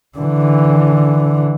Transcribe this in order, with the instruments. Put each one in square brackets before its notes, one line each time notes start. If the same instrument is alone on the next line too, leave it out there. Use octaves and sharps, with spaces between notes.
[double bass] D3 E3